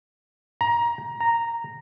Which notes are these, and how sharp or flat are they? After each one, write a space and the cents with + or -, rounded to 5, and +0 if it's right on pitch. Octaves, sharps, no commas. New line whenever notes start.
A#5 +20
A#5 -5